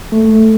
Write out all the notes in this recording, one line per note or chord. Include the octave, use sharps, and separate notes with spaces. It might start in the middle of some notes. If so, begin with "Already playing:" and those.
A3